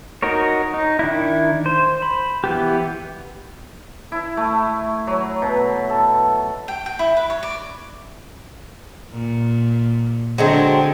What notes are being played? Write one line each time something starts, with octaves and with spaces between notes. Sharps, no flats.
D#4 F#4 A#4 C#5
D#4
D#3 D4 E4
C5
B5
E3 B3 G4
E4
A3
F#3
B2
A4
G5
G5
E4
B4
C#5
D5
A#2
D3 F#3 G#3 C4